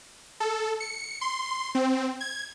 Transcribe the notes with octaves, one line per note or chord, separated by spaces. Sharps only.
A4
C#7
C6
C4
G#6